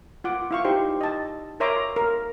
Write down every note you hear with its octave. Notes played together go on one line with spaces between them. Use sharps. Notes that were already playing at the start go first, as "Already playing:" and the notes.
F4 F#5 D6
E4 F5 C#6
D#4 G4 C5 C6
D#5 A5
A#4 C#5 E5 A#5 C6 D6
A#4